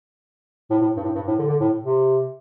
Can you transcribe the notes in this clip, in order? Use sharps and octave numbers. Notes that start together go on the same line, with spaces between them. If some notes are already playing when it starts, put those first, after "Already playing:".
A2
A2
G2
A2
G2
A2
D3
D3
A2
C3